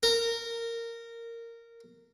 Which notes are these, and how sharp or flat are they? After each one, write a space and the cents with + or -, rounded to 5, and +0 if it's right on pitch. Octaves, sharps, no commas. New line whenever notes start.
A#4 -15